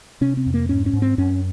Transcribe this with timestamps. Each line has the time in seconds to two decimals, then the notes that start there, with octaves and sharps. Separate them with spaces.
0.21 C3 C#4
0.37 C4
0.46 F2
0.54 A#3
0.69 G#2 C#4
0.86 C#4
0.93 G#2
1.02 C4
1.18 F#2 C#4